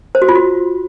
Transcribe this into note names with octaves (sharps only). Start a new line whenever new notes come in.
C5
F#4
F4
F#4